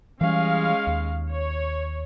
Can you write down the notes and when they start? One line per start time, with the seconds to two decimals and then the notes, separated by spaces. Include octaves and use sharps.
0.21 E3 G3 G#3 C#4 F5
0.87 D#2
1.31 C#5